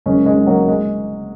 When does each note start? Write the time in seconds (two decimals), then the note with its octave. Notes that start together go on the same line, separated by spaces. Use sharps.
0.06 F#1 G#3 C#4
0.26 G#3 C#4
0.36 F#3
0.47 F#3 A#3
0.68 G#3